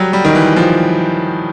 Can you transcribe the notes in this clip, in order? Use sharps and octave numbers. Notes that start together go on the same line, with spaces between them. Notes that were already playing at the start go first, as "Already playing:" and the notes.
Already playing: F#3 G3
G3
D#3
E3
F3